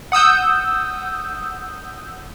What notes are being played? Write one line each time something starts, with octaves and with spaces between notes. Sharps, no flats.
F#5 D#6 E6 G6